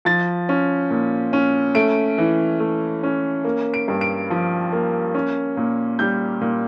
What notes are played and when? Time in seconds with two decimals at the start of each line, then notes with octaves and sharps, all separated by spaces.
0.05 F3 A6
0.49 C#4
0.91 A#2
1.33 C#4
1.75 A3 D7
2.18 E3
2.60 A3
3.03 C#4
3.44 A#3
3.74 D7
3.88 G2
4.01 D7
4.30 F3
4.72 A#3
5.14 C#4
5.57 A#2
5.99 G3 G6
6.41 A#2